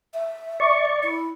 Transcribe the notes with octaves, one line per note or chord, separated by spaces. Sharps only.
E5
D5 C#6
E4